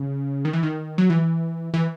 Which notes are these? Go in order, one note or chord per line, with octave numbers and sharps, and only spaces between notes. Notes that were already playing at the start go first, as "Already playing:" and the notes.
Already playing: C#3
D#3
E3
D#3
F#3
E3
E3